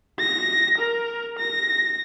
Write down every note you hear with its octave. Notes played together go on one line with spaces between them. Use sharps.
A#6
A#4
A#6